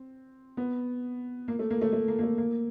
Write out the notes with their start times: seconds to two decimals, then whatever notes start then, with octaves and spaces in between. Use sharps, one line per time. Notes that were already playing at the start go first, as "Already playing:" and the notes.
Already playing: C4
0.57 B3
1.48 A#3
1.59 A3
1.70 A#3
1.81 A3
1.92 A3
2.08 A#3
2.19 A#3
2.23 A3
2.38 A#3